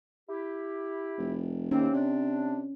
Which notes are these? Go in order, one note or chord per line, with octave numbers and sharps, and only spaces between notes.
E4 G4
F1
D#2 C3 A#3 C4 C#4
C3 D4